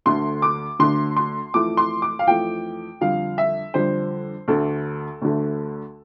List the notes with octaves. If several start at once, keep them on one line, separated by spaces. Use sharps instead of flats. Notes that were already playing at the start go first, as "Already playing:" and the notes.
D2 D3 A3 C6
D6
D2 D3 A3 C6
C6
F2 E3 A3 D6
C6
D6
F5
F2 E3 A3 G5
F2 D3 G3 F5
E5
F2 D3 G3 C5
D2 D3 A3 A4
D2 D3 A3